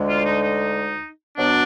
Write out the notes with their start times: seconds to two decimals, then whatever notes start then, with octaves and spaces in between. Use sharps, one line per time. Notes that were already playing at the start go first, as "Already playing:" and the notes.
Already playing: D2 D3 G#3
0.09 F4
0.26 D#4
0.41 D#4
1.38 B2 F#3 B3 D4